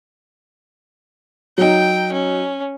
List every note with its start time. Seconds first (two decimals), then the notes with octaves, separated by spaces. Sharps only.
1.58 F#3 D#4 G5
2.12 C#4